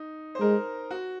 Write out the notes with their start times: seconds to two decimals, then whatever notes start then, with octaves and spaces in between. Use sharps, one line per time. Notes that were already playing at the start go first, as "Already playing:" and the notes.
Already playing: D#4
0.35 C5
0.40 G#3 A#4
0.91 F#4